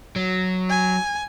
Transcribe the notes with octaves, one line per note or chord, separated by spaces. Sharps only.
F#3
G#5